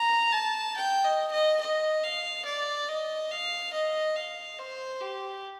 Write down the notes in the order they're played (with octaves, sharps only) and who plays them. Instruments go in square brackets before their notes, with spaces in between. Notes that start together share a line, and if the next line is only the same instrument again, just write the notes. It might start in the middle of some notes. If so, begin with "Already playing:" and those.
Already playing: [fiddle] A#5
A5
G5
D#5
D#5
D#5
F5
D5
D#5
F5
D#5
F5
C5
G4